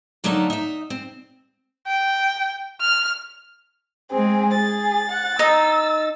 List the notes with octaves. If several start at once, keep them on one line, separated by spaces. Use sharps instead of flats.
D3 F#3 A3 A#3 D#4
D#4 E5
C4
G5
F6
G#3 C4 G#4
G#4 A6
F#5
D#4 E6